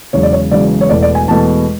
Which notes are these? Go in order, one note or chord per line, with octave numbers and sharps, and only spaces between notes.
E1 E2 C#3 F#3 C#5
D5
C#5
E1 E2 C#3 F#3 D5
C#5
E1 E2 B2 A3 D5
D5
G#5
E1 E2 B2 A3 A5